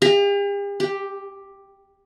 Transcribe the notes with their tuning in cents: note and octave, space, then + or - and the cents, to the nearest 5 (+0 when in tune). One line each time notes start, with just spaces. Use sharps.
G4 +45
G4 +5